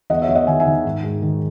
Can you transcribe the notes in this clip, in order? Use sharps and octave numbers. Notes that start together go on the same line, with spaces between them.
E2 D#5 F#5
C#5 E5
E2
D#5 F#5
D#3 E5 G#5
E5 G#5
D#3
G#2
G#2
D#3